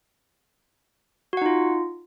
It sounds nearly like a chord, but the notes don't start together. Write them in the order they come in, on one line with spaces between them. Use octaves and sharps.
F#4 F#5 D#4 F4